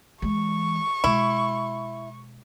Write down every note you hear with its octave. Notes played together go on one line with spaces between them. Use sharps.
E3 G#3 C#6
B2 G#3 E4